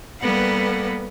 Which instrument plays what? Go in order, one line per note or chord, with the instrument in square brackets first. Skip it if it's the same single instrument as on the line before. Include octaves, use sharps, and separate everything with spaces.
[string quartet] G3 A#3 B3 A4 B4 F#5